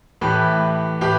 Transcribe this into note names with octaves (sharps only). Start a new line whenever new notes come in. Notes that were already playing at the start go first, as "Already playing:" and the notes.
A2 E3 G4 B4
A2 G4 B4